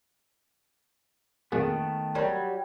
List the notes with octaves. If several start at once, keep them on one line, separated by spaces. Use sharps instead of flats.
F2 A#2 D#3 G#3 A3 B3
F#3 G3 A#4